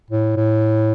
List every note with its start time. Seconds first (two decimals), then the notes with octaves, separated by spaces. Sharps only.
0.10 A2
0.37 A2